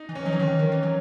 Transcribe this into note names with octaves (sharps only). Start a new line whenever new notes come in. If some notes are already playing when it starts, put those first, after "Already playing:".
Already playing: D#4
E3
C#4
F#3 D#4
E3
D#3
C#4
E3
D#3
E3
F#3